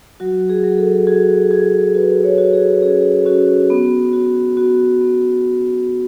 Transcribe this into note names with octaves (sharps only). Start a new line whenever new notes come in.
F#3 F#4
G#4
F#3
A4
F#4 G#4
F#4 G#4
F#4 B4
C#5
F#4
G#4
C#4 G#4
C#4 F#4
B3
F#4
B3 F#4
B3